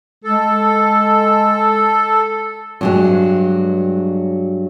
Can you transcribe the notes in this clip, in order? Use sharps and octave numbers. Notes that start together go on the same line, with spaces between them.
G#3 A4
G2 F#3 G#3